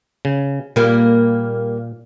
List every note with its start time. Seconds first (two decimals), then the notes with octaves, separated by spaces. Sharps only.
0.25 C#3
0.76 A#2 G3 A#3